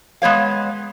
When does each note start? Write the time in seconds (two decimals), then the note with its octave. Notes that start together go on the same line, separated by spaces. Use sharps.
0.22 G#3 B3 C#5 F5